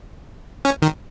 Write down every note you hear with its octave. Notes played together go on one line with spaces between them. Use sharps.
C#4
D#3